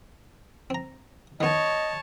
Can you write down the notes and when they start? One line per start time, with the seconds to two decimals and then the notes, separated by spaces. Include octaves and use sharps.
0.70 C4 A#5
1.41 D#3 B3 C#5 D#5 A5